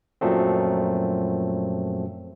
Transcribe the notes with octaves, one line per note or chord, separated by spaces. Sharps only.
F#2 A#2 F3 F#3 A3 C4